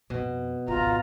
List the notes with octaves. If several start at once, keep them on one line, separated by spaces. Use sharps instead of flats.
F2 B2
G#1 C#2 F4 A#5